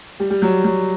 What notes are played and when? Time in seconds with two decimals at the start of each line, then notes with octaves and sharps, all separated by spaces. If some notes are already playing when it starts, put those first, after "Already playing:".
0.20 G3
0.30 G3
0.42 F#3
0.64 F#3